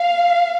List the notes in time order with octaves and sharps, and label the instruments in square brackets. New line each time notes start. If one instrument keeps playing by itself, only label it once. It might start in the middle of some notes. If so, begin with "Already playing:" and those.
Already playing: [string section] F5